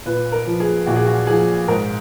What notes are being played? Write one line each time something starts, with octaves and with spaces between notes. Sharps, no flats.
A#2 B4
A#4
F3
G#4
A#2 F#4
G#4
F#4
F3 G#4
G#2 A#4